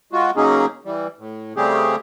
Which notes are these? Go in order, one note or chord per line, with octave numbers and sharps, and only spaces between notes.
G#3 F4 F#4
C#3 F#3 A#3 C#4 D#4 G#4
E3 G3
A2
C#3 G3 A3 C4 G4 G#4